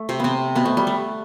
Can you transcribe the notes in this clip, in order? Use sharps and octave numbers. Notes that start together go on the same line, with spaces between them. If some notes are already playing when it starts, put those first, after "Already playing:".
Already playing: A3
C3 C4
C3 B3 C4
B2 B3
A3
G3
A3